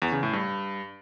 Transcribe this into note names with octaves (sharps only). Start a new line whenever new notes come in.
E2
C#3
A2
G2